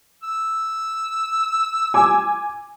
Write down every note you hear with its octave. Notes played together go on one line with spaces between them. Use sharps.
E6
G#5 D6